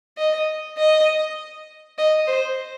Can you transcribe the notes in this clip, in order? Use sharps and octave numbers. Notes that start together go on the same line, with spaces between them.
D#5
D#5
D#5
C5